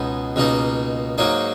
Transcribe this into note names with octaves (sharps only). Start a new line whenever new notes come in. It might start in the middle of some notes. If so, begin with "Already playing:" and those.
Already playing: C#2 B2 G#3 B3 D#4
C#2 B2 A#3 D#4
G#2 F#3 A#3 D#4